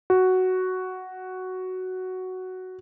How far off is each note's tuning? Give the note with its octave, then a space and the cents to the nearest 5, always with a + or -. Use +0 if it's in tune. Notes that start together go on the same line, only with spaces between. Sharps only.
F#4 +5